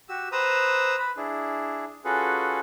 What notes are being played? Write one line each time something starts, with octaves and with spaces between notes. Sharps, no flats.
F#4 G4 E6
B4 C5 A#5 D#6 E6
B4 B5
D4 E4 G#4
C#4 F4 F#4 G#4 A4 B4